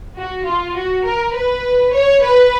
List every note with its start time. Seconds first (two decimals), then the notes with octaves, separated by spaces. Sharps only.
0.16 F#4
0.46 F4
0.76 F#4
1.05 A#4
1.34 B4
1.93 C#5
2.22 B4